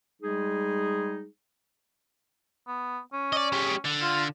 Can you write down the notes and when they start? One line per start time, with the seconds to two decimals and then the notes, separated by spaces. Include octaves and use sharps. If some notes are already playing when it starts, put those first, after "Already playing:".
0.21 G3 G#3 D#4 G#4
2.67 B3
3.13 C#4
3.32 D5 D#5
3.52 G#3 G4
3.85 D3
4.02 F4